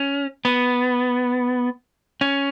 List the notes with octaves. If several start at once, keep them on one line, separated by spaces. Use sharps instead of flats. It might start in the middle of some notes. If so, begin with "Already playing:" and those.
Already playing: C#4
B3
C#4